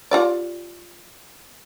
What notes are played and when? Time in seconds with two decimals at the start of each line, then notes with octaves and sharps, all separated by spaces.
0.11 F4 G4 D5